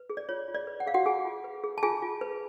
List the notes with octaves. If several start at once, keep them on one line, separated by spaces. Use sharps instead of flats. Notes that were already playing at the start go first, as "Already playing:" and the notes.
Already playing: B4
G#4
D5
F4 C#5
F4
D5
B4
F#5
G#4 F5
F#4 F#5
F4 G#4 G#5
F4
B4
G#4
A5
F4 G#4 G#5
F4
B4